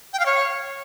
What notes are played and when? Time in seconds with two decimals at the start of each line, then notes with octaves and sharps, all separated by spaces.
0.13 G5
0.20 F5
0.26 C#5